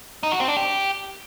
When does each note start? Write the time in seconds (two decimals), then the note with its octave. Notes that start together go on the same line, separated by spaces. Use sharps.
0.23 D#4
0.32 F#4
0.40 C4
0.48 D4
0.57 G4